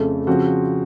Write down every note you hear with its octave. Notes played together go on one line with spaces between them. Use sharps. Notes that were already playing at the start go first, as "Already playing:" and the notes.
Already playing: F2 C#3 A3
C#3 F3 C4 F#4